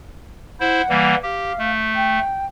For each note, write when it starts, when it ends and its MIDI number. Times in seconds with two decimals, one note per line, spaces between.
0.60 0.82 64
0.60 0.82 72
0.60 1.18 78
0.89 1.15 52
0.89 1.15 55
0.89 1.15 58
1.23 1.52 67
1.23 1.71 77
1.59 2.19 57
1.95 2.46 79